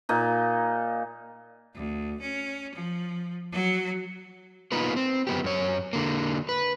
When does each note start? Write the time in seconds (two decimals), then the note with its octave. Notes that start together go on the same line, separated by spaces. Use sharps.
0.09 A#2 D#4
1.75 D2
2.20 C#4
2.75 F3
3.52 F#3 F#4
4.72 A#3 B3 D#4 F4 B4
4.96 C4
5.27 F#2 B3 G4
5.44 F#2 C#5
5.93 D3 A#3
6.49 B4